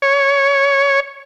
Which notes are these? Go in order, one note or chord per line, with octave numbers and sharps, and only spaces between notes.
C#5